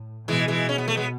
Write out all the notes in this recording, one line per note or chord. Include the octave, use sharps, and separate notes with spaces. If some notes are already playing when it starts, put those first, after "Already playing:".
Already playing: A2
B2 E3 G#3
E3 G#3
C#4
B3
A3
G#3 B3